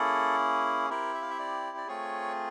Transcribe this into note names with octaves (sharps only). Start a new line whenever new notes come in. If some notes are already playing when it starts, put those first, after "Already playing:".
Already playing: A#3 C#4 E4 G#4 A4
C4 E4 G4 A#4
E5
F5
E5
D5
D5
A3 C4 F4 G#4 C#5